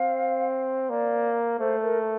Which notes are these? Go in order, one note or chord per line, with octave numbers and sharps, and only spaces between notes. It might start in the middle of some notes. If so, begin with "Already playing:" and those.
Already playing: C4 F5
A#3 D5
A3 C5
A#4